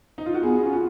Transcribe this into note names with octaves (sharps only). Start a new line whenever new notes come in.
D#4
F4
F#4
B3 G#4
C#4 F4
F#4